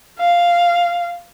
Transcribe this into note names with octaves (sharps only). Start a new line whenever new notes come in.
F5